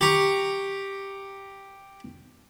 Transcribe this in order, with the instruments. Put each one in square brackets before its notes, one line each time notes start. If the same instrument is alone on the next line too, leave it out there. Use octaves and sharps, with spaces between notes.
[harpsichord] G4 A#5 C#6